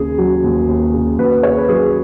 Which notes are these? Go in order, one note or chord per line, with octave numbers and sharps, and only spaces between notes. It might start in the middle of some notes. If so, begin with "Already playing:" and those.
Already playing: D#2 C#3 G#4
F#3
D#2
D#2
C#3
D#2 F#4 B4
C#3 G#4 C#5
B4
F#3 G#4